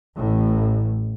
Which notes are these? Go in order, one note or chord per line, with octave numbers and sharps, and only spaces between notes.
A1 A2